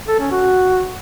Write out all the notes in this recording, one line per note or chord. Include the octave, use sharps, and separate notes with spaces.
A4
C#4
F#4